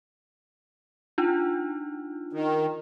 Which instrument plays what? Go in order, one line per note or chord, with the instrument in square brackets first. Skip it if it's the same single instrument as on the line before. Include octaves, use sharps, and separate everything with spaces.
[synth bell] D4 D#4 F4
[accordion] D#3